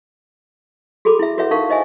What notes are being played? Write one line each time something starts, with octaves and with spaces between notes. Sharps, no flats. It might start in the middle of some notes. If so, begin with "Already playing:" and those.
F#4 G#4 A4 B5 D6
E4 E5
F#4 B4 C#5 E5 F#5
D#4 A#4 F5 C#6
C5 D#5 E5 G#5